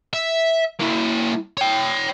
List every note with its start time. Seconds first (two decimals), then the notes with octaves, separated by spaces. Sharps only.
0.13 E5
0.79 A#3 E4
1.57 C#5 G5